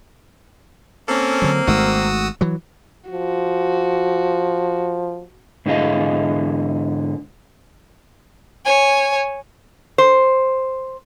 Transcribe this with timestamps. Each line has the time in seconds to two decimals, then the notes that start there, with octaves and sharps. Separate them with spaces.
1.08 A#3 C4 C#4 A4
1.42 D3 F#3
1.67 G#1 G#2 A3 F#4 D#6 E6
2.41 E3 F#3
3.10 F3 F#4
5.66 G#2 D3 E4 G#4 D#5 F5
8.65 C#5 G#5
9.98 C5